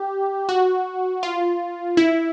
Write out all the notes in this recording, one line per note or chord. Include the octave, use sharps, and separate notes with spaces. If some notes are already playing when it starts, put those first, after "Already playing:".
Already playing: G4
F#4
F4
E4